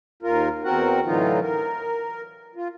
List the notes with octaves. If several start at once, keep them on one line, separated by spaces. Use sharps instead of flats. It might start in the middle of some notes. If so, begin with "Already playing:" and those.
D#2 F4 A#4
E2 C4 F#4 A#4 F#5
A2 D3 E3 F#3 D#4 F4
A#4
F4